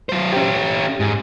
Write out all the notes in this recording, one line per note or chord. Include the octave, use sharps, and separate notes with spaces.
F#3 C5
C#4 G4
G#2